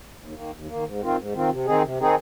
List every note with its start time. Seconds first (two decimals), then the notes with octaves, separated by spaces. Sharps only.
0.18 D#2
0.34 D#3 A#3
0.51 D#2
0.68 D#3 A#3
0.84 G#2
1.00 D#3 C4 F4
1.17 G#2
1.33 D#3 C4 F4
1.49 C3
1.66 D#3 C4 D#4 G#4
1.82 C3
1.98 D#3 C4 D#4 G#4